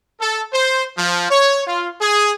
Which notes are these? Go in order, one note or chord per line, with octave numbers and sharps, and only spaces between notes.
A4
C5
F3
C#5
F4
G#4